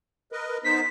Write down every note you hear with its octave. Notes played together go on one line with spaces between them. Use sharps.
A#4 B4 D#5
B3 D#4 C5 B6